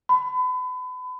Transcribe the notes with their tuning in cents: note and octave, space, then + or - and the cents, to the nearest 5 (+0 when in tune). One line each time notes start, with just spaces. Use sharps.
B5 +35